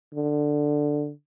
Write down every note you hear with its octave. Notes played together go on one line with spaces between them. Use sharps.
D3